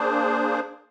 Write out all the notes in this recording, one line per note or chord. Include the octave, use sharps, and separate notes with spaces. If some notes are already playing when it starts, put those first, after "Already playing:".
Already playing: A#3 D4 G#4 C5